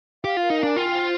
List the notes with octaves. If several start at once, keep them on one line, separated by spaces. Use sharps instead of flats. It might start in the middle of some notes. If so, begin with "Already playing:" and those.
G4 F5
F4 A#4
D#4
D4 G#5
F4 G5
C5